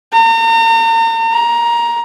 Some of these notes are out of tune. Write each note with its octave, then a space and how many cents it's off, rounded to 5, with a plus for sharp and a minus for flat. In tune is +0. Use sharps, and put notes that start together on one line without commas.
A#5 -40
A#5 +15